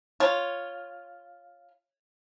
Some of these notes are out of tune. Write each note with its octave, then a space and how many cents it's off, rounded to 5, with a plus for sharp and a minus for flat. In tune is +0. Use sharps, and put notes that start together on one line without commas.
F4 +0 C#5 +0